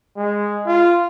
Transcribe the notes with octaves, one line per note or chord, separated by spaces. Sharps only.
G#3
F4